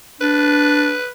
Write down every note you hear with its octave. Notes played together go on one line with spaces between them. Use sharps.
D4 B4